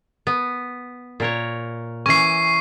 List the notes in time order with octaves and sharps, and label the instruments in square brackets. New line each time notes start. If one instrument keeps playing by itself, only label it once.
[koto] B3
A#2 A#4 C#5
[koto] E3 C#4 [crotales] C#6 C7